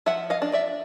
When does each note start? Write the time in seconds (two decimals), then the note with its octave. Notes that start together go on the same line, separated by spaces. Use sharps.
0.06 F3 E5 F#5
0.30 D#5 F5
0.42 D4
0.53 D5 E5